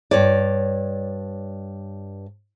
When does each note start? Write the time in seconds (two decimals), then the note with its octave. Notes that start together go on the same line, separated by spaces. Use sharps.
0.11 G2 C#5 D5